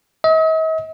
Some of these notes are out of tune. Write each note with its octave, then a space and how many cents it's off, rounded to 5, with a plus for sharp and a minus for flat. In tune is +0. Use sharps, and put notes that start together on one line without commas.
D#5 +45